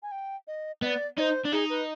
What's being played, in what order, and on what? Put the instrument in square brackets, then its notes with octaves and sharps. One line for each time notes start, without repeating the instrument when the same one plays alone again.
[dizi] G#5
G5
D#5
[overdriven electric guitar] B3 [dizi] D5 D#5
[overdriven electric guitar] D#4 [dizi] C5 D5
[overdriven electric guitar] D4
[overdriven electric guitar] D#4 [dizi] G#4
[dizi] B4